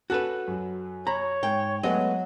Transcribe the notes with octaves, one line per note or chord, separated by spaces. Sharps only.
C#4 F#4 A4 B4 F#6 E7
F#2 F#3
C#5 A#5 B5
G#2 G5
F#3 G#3 A3 B3 D#5